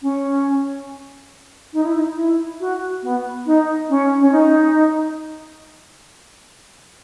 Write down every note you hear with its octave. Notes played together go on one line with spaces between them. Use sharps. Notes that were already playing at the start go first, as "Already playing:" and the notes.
C#4
D#4
E4
D#4
E4
F#4
B3
D#4
C#4
C#4
D#4